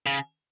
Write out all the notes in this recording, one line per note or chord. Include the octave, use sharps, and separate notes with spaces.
C#3